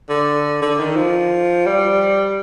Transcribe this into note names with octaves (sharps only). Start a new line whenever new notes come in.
D3
D3
D#3
F3
G3